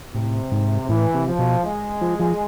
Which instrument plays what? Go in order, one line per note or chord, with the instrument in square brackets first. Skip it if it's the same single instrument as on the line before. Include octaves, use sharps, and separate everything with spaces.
[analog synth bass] A2 [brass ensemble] C3
[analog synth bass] G#2
[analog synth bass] A2 [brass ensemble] E3
[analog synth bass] C3
[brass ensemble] F3
[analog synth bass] B2
[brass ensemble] G#3
[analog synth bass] F3
F3